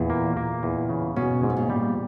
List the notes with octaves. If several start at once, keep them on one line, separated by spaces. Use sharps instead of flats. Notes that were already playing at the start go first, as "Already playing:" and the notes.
Already playing: E2 A#2
A#3
A#3
E2
C#3
B2 C#4
G#2
B2
A#2
G3